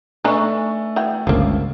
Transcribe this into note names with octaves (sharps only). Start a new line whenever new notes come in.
A3 D4 D#4 B4 G#5 C#6
E3 F#4 G5
G1 C#2 F3 A#3